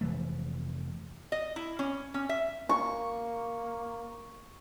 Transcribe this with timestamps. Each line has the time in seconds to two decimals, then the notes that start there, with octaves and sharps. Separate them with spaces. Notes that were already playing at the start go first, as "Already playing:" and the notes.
0.01 F1 E3 A3
1.32 D#5
1.56 E4
1.79 C#4
2.14 C#4
2.29 E5
2.69 A#3 C#6